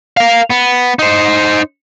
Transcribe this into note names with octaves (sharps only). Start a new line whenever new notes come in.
A#4 F5
B3
D#4 C5